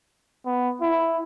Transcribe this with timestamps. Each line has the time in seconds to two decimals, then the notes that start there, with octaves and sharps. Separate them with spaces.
0.46 B3
0.81 E4